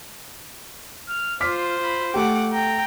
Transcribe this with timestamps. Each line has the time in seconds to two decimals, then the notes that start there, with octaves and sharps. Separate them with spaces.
1.09 F6
1.41 F4 C5 D6 F6 B6
1.80 F4 B5
2.14 A3 G4 F#5 D6
2.53 G5 A#5